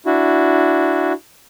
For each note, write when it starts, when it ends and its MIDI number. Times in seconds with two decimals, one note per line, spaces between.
0.06 1.13 62
0.06 1.13 64
0.06 1.13 66